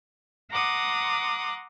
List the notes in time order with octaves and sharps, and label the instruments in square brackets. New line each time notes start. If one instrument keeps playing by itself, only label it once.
[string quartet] F#5 A#5 C6 D6 D#6 F#6